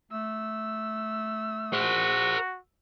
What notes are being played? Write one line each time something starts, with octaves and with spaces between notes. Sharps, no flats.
A3 E6
F#4 A#4 C5